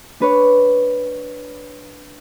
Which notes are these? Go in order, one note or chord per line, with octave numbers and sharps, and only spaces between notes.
D4 B4 C#5